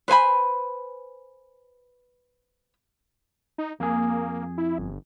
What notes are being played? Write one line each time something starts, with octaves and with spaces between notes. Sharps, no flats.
B4 C5 G#5 B5
D#4
F2 A#3 G#4
E4
G1